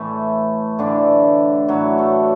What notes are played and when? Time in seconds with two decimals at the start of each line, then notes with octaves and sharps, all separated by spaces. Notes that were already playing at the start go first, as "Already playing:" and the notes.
Already playing: A2 E3 A3
0.79 A2 D3 E3 D4
1.68 A2 E3 F#3 F#4
1.98 A3 A4